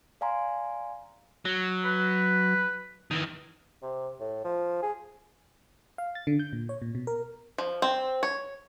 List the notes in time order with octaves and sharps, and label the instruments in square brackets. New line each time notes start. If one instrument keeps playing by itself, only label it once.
[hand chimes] D5 F5 G#5 A#5 C6
[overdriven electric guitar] F#3
[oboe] B4
[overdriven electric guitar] D#3 E3
[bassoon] C3
A2
F3
G#4
[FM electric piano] F5
A6
D3
G6
A#2
C#5
A#2
B2
A#4
[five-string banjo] F3
C4
C#5